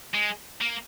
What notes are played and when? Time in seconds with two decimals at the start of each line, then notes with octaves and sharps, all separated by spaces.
0.14 G#3
0.61 A#3